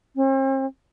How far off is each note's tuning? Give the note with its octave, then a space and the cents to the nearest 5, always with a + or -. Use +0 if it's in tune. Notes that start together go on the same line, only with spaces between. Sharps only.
C4 +45